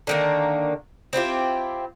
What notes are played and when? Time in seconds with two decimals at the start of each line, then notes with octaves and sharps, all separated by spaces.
0.07 D3 D#3 A#3
1.13 C4 E4 F4 G4